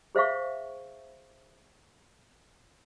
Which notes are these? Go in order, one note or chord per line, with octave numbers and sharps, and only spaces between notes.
G#4 C5 E5 F5 C#6